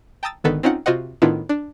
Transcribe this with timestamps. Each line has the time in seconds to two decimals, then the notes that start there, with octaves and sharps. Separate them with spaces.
0.23 G5 A5 A#5 D#6 E6 A6
0.44 G#1 D3 D#3 B3 A4 B4
0.63 C4 C#4 D#4 F4 F#5
0.86 C3 F4 F#4 C5 D#5 F#5
1.22 A2 D#3 B3 D4 E4 F4
1.49 D4